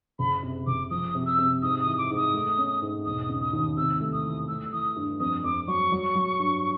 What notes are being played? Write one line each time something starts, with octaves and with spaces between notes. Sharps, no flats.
F#1 B5
C3
F#1 D6
F3 D#6
C3
E6
C3
G#2 D#6
D#6
E3
D6
G#2
D#6
A3
C#4
G#2
E1 D#6
C#3
D#6
D#2
C3 E6
A3
D#6
E3
A3 E6
E3 D#6
G2
F2 D#6
F2 D6
F#3 C#6
F#3
F#3
G2